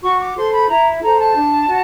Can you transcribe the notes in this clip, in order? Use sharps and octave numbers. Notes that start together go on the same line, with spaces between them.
F#4 C#6
D6
A4 C5 C6
B5
E4 A#5
A4 C5 A#5
A5
D4
F#4